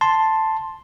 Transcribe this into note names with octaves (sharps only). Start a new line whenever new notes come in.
A5 C6